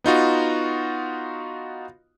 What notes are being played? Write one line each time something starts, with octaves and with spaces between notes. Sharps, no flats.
B3 D#4 F4 F#4